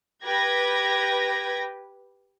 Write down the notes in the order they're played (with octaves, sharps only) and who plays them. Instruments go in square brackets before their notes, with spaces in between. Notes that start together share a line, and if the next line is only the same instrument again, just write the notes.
[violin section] G4 B4 G#6 A#6